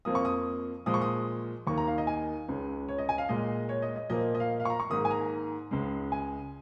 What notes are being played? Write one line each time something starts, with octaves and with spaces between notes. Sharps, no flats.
F2 F3 A#3 D#6
C#6
D#6
A#2 F3 G#3 D#6
C#6
D#6
D#2 D#3 A#3 C#6
A#5
F5
D#5
G#5
C#2 C#3 G#3
C#5
D#5
G#5
F5
A#2 G#3 D#5
C#5
D#5
D#5
A#2 F3 A#3 D#5
D#5
F5
F5
C#6
A#5
C#6
G#2 D#3 A#3 D#6
G#5
A#5
C#2 C#3 G#3
G#5